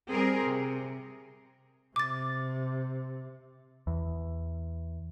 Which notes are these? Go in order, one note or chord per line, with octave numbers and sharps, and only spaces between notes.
G3 C4 G#4 A#4
C3
C3 D6 A6
E2